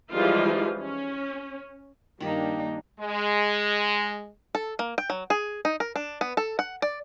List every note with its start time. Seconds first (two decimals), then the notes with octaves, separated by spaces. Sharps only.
0.11 E3 F3 G3 G#3 D#4 F4
0.78 C#4
2.20 G2 D#3 A#3 D4 D#4 G4
3.00 G#3
4.55 A4
4.79 A#3
4.98 G5
5.10 F#3
5.30 G#4
5.65 D#4
5.80 A#4
5.96 D4
6.21 B3
6.37 A4
6.59 F#5
6.82 D5